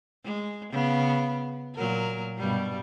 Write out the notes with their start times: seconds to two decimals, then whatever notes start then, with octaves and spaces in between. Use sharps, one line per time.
0.25 G#3
0.72 C#3 B3
1.75 A#2 F#3 A#4
2.38 G2 B2 G3